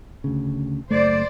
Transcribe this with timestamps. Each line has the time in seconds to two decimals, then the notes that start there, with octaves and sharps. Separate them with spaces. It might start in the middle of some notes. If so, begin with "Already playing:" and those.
0.24 D2 C#3
0.90 F#1 A3 C5 D5